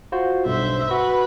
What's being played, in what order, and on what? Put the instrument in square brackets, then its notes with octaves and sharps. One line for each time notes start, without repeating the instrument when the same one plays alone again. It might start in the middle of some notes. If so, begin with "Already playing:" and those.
[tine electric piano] F4 F#4 C5
[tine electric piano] B1 G2 [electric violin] C5 E5
[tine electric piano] F#4 [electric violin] B4